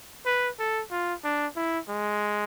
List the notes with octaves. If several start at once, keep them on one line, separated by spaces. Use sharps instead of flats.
B4
A4
F4
D4
E4
G#3